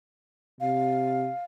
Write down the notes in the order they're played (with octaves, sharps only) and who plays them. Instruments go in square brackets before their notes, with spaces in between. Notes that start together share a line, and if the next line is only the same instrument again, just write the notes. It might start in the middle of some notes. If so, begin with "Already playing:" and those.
[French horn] C3 [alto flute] F5